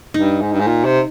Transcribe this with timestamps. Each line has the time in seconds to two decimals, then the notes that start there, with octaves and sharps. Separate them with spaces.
0.14 G2 D#4
0.41 G#2
0.52 G2
0.60 G#2
0.67 A#2
0.84 C3